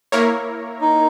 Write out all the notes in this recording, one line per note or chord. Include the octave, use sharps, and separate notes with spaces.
A#3 E4 A#4 C#5
D#4